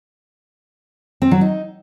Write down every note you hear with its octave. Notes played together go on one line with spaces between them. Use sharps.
C4
F#3
D#4